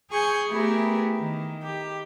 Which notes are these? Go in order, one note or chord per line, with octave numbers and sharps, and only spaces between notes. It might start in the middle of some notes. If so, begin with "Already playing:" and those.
G#4 G#5 C#6 G6
A3 B3 E4 G4 G#4 A#4
D#3
G4